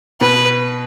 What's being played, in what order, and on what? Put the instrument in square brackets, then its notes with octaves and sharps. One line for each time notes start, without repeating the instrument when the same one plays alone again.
[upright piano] B2 [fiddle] B4